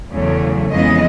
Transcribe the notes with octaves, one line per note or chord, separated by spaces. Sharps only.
E2 C#3 F#3 A3
F2 C#3 E3 G#3 B3 D#5